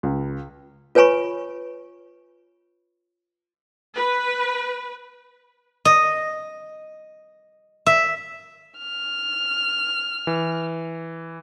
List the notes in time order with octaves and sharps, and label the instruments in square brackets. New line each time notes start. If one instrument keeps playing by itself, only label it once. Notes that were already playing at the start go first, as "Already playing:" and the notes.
[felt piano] C#2
[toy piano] F4 B4 C#5 G#5 B5 C#6
[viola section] B4
[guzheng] D#5
E5
[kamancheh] F6
[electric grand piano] E3